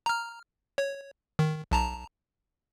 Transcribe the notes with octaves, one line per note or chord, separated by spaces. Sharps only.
A#5 F6
C#5
D#3
B1 A5 A#5